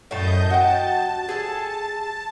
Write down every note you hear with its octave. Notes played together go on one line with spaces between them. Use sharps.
F#2 A2 A3 D#5 A5 G6
F#4 G5 A5
G#4 A4